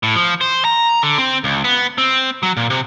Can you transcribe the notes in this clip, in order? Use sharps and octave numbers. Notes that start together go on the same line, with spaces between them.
A2
F3
C5
A#5
D3
C4
C#2
B3
C4
F#3
A#2
C3